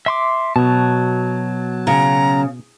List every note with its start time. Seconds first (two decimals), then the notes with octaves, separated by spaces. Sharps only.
0.06 E5 C6 D6
0.56 B2 F#3 A5
1.87 C#3 A#5